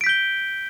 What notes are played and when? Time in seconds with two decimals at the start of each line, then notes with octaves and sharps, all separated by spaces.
0.01 D7
0.04 B6
0.06 G6
0.09 G7